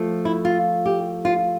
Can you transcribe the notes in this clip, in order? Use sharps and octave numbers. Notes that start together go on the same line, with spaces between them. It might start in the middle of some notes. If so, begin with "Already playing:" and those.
Already playing: F3 A3
E4
F4
G4
F4